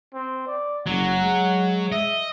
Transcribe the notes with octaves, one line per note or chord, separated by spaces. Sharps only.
C4
D5
F#1 F#3 F#5
G#3
D#5 E5